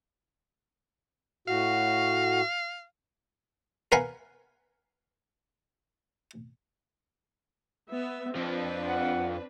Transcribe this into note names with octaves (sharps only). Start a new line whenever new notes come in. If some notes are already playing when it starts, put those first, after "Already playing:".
A2 F#4 F5
A#4 B4 F5 F#5 G#5
B3 E5
F2 F3 C4 D4 B4
F#5